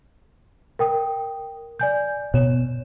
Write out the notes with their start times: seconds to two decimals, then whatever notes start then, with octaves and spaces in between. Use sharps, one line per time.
0.79 A#4 G5 D#6
1.79 D5 G#5 G6
2.34 B2 C#5 E7